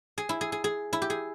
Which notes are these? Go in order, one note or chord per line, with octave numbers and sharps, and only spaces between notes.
G#4
E4
G#4
G#4
G#4
E4
G4
G#4